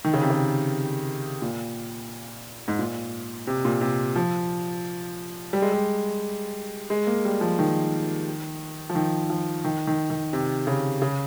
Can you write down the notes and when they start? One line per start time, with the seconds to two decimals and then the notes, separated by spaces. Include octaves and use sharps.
0.04 D#3
0.13 C#3
0.22 C3
0.30 C#3
1.42 A#2
2.68 G#2
2.79 A#2
3.47 C3
3.65 A#2
3.81 C3
4.16 F3
5.53 G3
5.62 G#3
5.72 G3
6.90 G#3
7.07 A#3
7.25 G3
7.41 F3
7.59 D#3
8.90 F3
8.95 D#3
9.30 F3
9.64 D#3
9.87 D#3
10.10 D#3
10.33 C3
10.67 C#3
11.02 C#3